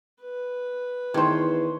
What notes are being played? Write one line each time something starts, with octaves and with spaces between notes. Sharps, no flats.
B4
E2 D#3 A3 C5 C#5